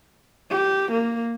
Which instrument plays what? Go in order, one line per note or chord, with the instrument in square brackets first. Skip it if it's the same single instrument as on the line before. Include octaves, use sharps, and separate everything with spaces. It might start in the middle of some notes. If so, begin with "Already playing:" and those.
[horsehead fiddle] G4
A#3